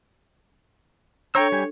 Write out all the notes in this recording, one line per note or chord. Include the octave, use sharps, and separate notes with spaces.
D4 A4 C#5 G5 A#5 E6
G3 G4 G#5